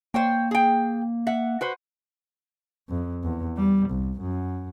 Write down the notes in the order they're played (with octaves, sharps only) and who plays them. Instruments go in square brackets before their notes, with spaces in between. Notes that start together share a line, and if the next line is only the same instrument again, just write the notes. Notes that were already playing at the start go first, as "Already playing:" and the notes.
[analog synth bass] A#3 [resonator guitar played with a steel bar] C5 C#5 G5
[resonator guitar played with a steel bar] G#4 G5
E5 F#5
F#4 B4 C5
[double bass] F2
E2
G3
C2
F#2